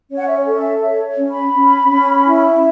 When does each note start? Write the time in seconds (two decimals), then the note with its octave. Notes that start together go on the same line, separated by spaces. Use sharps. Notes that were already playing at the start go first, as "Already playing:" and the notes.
0.10 C#4 C#5
0.19 F#5
0.27 E5
0.35 C#5
0.47 A4
0.59 E5
0.82 C#5 E5
1.17 C#4
1.30 B5
1.53 C#4
1.90 C#4
2.25 E4